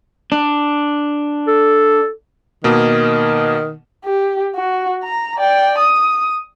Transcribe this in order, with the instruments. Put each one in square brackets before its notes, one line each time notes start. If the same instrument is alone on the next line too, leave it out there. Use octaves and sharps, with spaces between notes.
[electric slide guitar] D4
[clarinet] A4
[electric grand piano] B2 A#3 [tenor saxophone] D#3
[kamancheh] G4
F#4
A#5
D5 G5
D#6